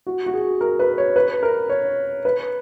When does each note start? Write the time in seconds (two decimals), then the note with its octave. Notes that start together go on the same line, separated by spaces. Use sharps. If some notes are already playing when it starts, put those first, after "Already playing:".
0.06 F#4
0.26 F#4
0.33 G#4
0.61 A#4
0.79 B4
0.98 C#5
1.16 B4
1.43 A#4
1.69 C#5
2.25 B4